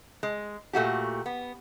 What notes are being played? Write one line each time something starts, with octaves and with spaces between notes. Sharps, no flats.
G#3
A#2 A3 F#4 G4
B3